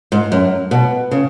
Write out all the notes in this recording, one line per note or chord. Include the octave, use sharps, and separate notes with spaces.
G#2
F#2
B2
C#3